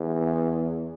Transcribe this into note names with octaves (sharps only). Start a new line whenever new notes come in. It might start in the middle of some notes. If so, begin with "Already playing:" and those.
Already playing: E2